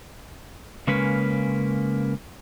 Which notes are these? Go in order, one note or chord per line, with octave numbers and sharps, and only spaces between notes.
C#3 G#3 A#3 C#4 B4